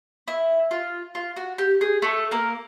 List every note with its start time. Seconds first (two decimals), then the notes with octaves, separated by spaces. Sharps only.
0.28 E4
0.71 F4
1.15 F4
1.36 F#4
1.58 G4
1.81 G#4
2.02 A3 A4
2.31 A#3 A#4